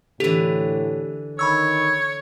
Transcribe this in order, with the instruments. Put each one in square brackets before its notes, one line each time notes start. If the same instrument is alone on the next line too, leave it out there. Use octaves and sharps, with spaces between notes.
[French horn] A2 [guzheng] D3 E3 [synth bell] G4
[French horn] D#3 [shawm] C#5 [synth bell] B5 C#6 E6